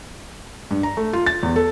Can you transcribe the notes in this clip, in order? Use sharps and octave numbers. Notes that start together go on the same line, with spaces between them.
G2
A#5
A3
F4
A6
E2
A4